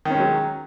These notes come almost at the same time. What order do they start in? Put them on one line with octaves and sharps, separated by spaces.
D#3 C#4 G#3 F#3